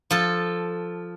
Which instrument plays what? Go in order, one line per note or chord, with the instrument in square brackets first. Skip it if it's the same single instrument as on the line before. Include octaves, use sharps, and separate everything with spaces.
[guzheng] F3 A4